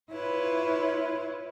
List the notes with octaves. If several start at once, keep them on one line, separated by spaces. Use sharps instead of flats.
E4 F4 B4 C#5